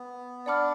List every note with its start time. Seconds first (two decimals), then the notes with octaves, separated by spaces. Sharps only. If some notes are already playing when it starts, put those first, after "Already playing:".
Already playing: B3
0.46 D4 D5 F#5 B5 D6 F6